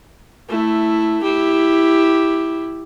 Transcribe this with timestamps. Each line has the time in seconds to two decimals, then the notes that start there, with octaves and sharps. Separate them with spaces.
0.49 A3 E4
1.23 E4 G4